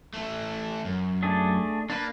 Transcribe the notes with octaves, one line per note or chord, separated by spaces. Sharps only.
E3 A3
F#2
A3 D4 G#4
A#3 D4 B4